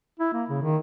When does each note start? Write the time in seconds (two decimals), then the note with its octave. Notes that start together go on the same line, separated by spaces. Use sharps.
0.19 E4
0.33 A#3
0.49 C#3
0.62 D#3